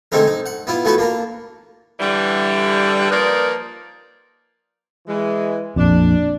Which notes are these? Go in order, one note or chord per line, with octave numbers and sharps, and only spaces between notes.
D3 G#3 A3 C4 D#4 A#4
D#4
F#5
B3 E4 F4
A3 B3 E4 F#4 B4
A#3 D4 A#4
D3 E3 G3
F3 A#3 D#4 A#4 B4 D5
E3 G#3
A#1 F2 D4